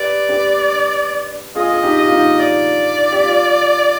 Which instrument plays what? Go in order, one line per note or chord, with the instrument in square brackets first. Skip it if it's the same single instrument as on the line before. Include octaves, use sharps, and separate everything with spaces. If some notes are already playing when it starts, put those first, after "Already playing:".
Already playing: [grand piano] G4 B4 [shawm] D5
[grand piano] G4 B4
[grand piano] F4 G#4 [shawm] D#5
[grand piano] G#4
D#4 G4
[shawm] D#5
[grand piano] F4
D#4
[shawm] D5
[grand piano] G4
F4